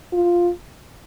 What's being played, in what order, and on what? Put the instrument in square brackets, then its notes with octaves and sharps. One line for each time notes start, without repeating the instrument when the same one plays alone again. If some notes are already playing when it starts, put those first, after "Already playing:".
[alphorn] F4